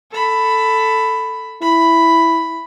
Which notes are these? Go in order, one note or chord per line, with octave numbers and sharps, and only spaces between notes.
A4 B5
E4 B5